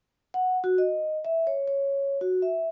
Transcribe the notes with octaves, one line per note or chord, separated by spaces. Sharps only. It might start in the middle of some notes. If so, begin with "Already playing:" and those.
F#5
F#4
D#5
E5
C#5
C#5
F#4
E5